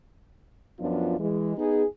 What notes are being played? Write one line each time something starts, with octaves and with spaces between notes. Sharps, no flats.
F#2 F3 B3 D4 F4
E3 G#3
B3 D#4 G#4